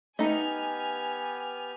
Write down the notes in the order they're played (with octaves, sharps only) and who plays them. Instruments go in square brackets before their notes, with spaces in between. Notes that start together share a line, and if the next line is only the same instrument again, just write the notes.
[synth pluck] A3 C#7 [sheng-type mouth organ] B3 G4 [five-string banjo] D#4 D#5 [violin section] G#5 F6